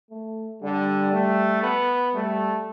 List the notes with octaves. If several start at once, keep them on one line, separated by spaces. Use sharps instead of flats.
A3
D3 G3
A3
B3
G3 A3